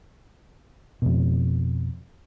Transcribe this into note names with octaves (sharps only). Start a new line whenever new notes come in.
F2 B2